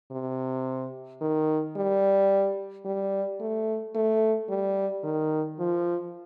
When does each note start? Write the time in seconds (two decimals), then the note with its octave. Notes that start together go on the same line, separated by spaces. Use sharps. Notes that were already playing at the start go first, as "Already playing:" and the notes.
0.11 C3
1.21 D#3
1.76 G3
2.85 G3
3.40 A3
3.95 A3
4.49 G3
5.04 D#3
5.59 F3